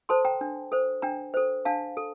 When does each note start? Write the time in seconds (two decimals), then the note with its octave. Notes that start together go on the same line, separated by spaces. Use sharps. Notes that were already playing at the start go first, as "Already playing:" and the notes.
0.09 A4 C5 A5 C6
0.25 G5 A#5
0.41 D4
0.72 A4 C5
1.02 D4 G5 A#5
1.34 A4 C5
1.65 D4 F5 A5
1.97 A4